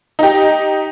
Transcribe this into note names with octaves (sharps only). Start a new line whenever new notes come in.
D#4 G4